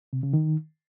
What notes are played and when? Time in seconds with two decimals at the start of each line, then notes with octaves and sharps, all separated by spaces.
0.13 C3
0.23 C#3
0.33 D#3